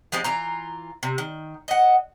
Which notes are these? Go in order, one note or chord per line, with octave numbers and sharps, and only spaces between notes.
F3 G#3 C4 G4
E3 F4 A#5
C3
D#3
D#5 F#5